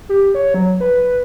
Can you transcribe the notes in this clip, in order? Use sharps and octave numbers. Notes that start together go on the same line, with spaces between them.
G4
C#5
F#3
B4